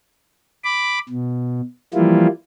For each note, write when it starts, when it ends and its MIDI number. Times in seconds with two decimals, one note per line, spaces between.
0.64 0.99 83
0.64 0.99 86
1.09 1.61 47
1.94 2.27 52
1.94 2.27 53
1.94 2.27 55
1.94 2.27 58
1.94 2.27 64
1.94 2.27 65